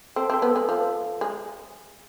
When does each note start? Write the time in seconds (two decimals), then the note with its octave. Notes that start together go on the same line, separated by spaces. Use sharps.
0.16 C4 A4
0.30 C4 A4
0.42 B3
0.51 G#3 A4
0.69 F3
1.21 G#3